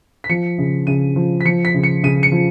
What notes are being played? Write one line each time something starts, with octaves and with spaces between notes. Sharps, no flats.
B6
F3 C#7
C#3
C#3 D#7
F3
B6
F3 C#7
B6
C#3
C#7
C#3 D#7
C#7
F3